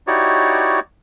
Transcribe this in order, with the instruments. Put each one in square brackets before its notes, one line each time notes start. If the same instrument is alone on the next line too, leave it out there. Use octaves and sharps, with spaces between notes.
[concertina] D#4 E4 F#4 G4 C#5 D5